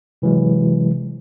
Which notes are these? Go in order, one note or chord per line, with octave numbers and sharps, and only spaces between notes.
C3 E3 F#3 G#3